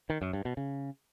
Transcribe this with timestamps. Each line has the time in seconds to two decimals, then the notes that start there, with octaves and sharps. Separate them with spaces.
0.10 D#3
0.21 F#2
0.33 G2
0.45 B2
0.57 C#3